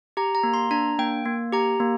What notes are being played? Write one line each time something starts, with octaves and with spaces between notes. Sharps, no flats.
G4 A#5
A#5
A#3
C6
D4 A#5
A#3 G5
A#3
G4 A#5
A#3